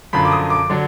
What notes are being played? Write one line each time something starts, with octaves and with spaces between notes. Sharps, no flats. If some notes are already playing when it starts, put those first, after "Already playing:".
F#2 D3 F3 B5
D6
D#6
D6
D3 F#3 D4